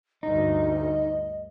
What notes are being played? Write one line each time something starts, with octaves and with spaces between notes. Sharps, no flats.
D2 G2 D#4 D#5